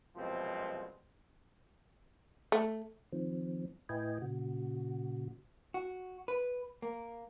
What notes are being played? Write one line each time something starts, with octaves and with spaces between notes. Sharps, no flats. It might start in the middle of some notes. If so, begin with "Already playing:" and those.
C2 F#2 B2 F3 G#3 C4
A3
D#3 F3 C4
A2 E4 B4 D#5 G5 G#5
A#2 C#3 F#4
F#4
B4
A#3